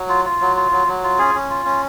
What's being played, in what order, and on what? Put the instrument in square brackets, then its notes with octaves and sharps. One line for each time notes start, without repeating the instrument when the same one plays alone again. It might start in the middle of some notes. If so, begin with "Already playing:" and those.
Already playing: [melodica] F#3
F4
F4
F#3
F4
F#3
F#3
F4
C#4 G#4
C#4
F4
C#4